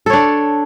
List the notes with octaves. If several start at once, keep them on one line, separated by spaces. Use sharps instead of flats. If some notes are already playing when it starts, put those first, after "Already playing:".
D4 A4 C#5